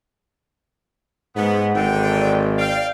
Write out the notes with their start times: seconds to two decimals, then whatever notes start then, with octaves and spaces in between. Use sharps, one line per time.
1.36 G#2 B3 F#5
1.75 G#1 D3 G5
2.14 D5
2.59 F5 G5